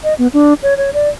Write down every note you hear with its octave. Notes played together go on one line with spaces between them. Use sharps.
D#5
B3
D4
C#5
C#5
D5